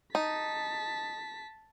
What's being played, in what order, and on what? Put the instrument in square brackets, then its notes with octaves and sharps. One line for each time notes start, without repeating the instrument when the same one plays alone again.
[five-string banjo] D#4 [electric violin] A5 B6